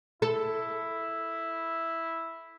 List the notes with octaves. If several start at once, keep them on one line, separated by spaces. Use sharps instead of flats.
E4 A4